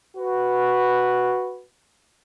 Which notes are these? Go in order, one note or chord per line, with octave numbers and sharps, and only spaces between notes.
F#4 B4